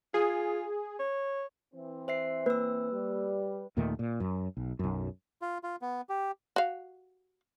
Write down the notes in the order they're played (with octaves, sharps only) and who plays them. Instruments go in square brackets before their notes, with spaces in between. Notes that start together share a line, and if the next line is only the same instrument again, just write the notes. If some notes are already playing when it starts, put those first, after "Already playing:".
[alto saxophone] F4 [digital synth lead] G#4
[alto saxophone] C#5
[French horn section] E3 C4
[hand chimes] C5 E5 C7
[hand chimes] A#3 E6 [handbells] B4
[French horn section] G3
[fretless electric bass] D#2 A#2 D#3 A3
A#2
F#2
B1
B1 F#2
[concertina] F4
F4
B3
G4
[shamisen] F#4 F5